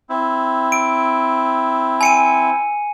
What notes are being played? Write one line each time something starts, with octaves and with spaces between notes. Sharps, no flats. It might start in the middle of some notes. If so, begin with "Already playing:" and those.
C4 E4
D7
G#5 C#7 D#7